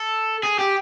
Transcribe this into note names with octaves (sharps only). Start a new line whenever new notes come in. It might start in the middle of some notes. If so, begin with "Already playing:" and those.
Already playing: A4
G#4
G4